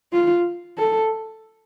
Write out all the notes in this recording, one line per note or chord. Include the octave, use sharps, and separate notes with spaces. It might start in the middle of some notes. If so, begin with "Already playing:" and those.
F4
A4